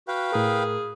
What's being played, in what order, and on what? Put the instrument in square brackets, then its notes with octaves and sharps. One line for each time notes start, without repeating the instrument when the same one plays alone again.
[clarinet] F#4 [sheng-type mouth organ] B4 F5 G5
[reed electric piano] A2 A#4 [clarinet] G#4